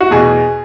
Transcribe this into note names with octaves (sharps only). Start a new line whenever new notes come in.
F#4
E2 B2 G#4